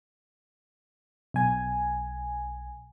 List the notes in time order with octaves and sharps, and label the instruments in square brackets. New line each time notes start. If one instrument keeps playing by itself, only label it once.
[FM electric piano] B1 G#5